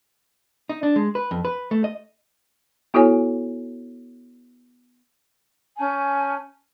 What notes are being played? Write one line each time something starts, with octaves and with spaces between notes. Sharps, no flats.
D#4
D4
G#3
B4
F2
B4
A3
D#5
B3 E4 F#4 A4 C#5 G#5
C#4 G#5 A5 G6